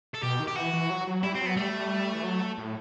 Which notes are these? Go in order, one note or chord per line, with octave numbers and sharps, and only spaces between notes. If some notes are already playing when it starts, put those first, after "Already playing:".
A4
B2 G4
D#3
G4
E3 F#4
E3
F#3
F#3
G3 E4
F#3 C4
B3
G3 A3
G3
E3
F#3
A2